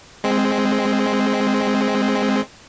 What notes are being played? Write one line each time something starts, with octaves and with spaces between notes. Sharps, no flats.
G#3 C4